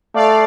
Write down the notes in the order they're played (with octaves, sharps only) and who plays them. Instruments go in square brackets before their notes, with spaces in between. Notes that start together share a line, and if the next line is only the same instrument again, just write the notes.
[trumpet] A3 [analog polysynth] D5 F5